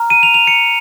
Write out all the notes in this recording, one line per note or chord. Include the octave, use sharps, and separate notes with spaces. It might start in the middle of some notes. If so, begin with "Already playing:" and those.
Already playing: A#5 F6
D#7
F7
F7
C#7